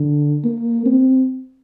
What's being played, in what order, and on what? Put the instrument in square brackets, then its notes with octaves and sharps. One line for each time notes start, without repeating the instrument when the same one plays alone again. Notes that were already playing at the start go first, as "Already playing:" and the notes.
Already playing: [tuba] D3
A#3
C4